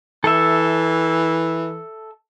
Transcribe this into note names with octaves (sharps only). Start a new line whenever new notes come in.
E3 A4 E5